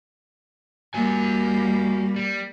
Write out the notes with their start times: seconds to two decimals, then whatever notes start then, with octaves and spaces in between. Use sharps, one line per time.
0.94 G3 A#3 F#4 G#5
2.16 G3